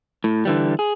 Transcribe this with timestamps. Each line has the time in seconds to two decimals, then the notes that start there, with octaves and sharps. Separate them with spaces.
0.24 A2
0.45 D3 E3 G3
0.79 G#4